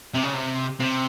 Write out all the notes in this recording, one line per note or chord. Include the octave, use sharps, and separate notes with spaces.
C3
C#3
C3
C3